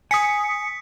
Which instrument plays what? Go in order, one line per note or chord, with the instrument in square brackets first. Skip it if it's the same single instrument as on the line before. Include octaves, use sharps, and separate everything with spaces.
[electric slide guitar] G#5 [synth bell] D#6 B6 C#7